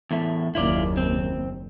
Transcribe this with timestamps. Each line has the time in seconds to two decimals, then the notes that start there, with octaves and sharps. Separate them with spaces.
0.11 E2 A2 A3
0.55 F#1 D#2 E4 F4 D5
0.97 C4